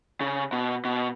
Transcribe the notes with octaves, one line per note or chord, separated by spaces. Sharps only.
C#3
B2
B2